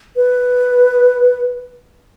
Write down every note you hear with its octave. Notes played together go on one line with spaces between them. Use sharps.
B4